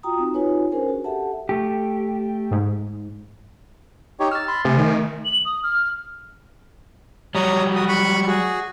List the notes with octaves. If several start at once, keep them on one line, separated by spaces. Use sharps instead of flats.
F4 F#4 G5 A#5 D#6
C4 D#4 F#4
D#4 F4 G4 B4 C#5 G#5
C#4 D4 G#4 A#4 C5 G#5
F#4
G4 A4 E5 F#5 A5
A3 G4
G#2
D#4 G4 C#5
E6 F6 A6
B5 C6
C3 A3 G#5
D#3
F#7
D#6
F6
F#3 G3 C#5 A#5 D#6
F#4 D#6
B5 C#6 F#6
F#4 G#4